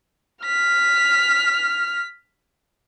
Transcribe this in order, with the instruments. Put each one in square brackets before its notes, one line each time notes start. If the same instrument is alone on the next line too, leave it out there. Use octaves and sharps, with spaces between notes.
[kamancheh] F6 [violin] B6